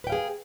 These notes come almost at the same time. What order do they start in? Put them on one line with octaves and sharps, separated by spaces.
B4 G5 F5 G#4